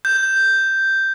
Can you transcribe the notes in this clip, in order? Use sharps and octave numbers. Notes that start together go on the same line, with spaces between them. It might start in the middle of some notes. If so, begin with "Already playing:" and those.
G6